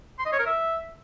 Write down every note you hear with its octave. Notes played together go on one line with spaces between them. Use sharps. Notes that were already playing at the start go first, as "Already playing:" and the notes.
C6
D#5
C#5
A#4
E5